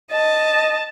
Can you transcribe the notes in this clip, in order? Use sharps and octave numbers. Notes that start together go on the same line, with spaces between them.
D#5 A5